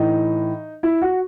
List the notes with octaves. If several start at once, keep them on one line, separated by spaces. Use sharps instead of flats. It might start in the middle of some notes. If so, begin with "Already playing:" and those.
Already playing: A2 E3 D#4
E4
F#4